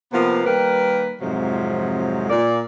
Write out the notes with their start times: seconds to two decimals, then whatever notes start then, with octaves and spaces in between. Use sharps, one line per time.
0.13 C3 F3 A#3 B3
0.45 D#3 G3 A#3 A#4 B4
1.21 F2 G#2 C3 F3 F#3 G#3
2.30 A#2 A#3 D5